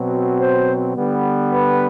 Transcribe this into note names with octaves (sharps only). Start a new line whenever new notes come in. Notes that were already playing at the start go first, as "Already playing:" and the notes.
Already playing: B2 F#3 C4
C5
D3 G3 B3
B4